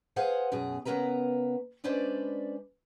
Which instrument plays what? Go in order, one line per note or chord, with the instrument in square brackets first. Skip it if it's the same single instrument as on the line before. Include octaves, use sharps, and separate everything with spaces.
[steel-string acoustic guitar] G#4 B4 C5 F5 F#5 G#5
F#2 B2 G#4
C#3 F#3 B3 A#4 B4 A#5
G#3 C#4 D4 B4 C5 D5